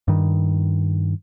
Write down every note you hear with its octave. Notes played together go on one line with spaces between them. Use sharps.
G2 D#3